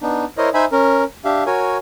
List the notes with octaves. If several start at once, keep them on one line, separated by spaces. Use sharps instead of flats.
B3 D4 D#4
E4 A#4 C5 C#5 D#5
D#4 C5 E5 G#5 B5
C#4 A#4
D4 G4 E5 F5
F#4 A#4 C#5 G#5